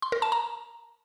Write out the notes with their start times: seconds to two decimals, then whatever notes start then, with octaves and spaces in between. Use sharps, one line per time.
0.02 C6
0.12 A#4
0.22 A5
0.32 A#5